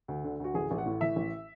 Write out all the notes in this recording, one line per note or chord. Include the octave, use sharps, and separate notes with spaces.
D2
D3
D2 F#4
A1 G#4
A1
F#5
A2
E3 E5
A1